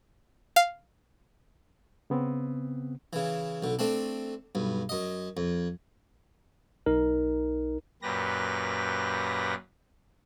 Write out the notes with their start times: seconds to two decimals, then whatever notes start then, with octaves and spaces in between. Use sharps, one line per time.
0.56 F5
2.10 C#3 B3 C4
3.13 C#3 E3
3.62 B1 D3
3.79 A3 C4 D4
4.55 B1 G2
4.89 F#2 D#5
5.37 F2
6.86 B1 D#4 A#4
8.02 F#2 A#2 G4 B4 A#6